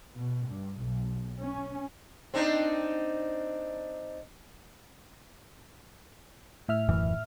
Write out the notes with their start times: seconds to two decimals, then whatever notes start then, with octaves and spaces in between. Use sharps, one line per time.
0.16 B2
0.47 G2
0.80 B1
1.41 C#4
2.34 C4 D4 D#4
6.68 A2 E5 F6
6.88 D#1 F#2 E3